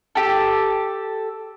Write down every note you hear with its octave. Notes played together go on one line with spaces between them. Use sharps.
G4 A4